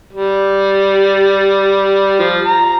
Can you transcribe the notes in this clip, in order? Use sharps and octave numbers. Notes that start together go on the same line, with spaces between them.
G3
F3
A#5